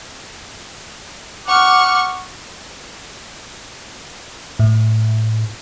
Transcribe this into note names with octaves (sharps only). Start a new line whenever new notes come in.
F#5 C#6 D6 F6
A2